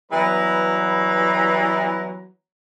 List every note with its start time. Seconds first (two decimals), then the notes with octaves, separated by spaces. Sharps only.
0.12 E3 F#3 G3 B3 B4 A#5